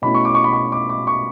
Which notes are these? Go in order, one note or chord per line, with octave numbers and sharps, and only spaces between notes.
B2 A3 C#4 E4 B5
C#6
D6
C#6
B5
C#6
D6
D6
C#6